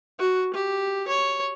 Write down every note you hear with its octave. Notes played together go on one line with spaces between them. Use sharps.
F#4
G4
C#5